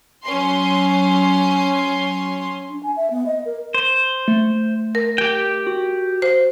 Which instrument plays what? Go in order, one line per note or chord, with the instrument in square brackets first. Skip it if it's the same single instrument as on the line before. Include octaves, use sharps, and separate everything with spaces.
[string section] F#3 C#4 C6
[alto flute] D4
G#5
E5
B3
D#5
A#4
[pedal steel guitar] C5
[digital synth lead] A3
[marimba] A#4
[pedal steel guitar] G4 G5
[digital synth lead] F#4
[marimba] C5